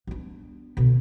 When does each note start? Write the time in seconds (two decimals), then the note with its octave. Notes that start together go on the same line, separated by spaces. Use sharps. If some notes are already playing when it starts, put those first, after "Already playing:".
0.07 B3 D4
0.77 B2 D3